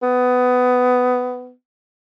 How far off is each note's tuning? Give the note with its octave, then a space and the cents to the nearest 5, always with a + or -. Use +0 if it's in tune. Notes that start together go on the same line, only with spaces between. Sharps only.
B3 +15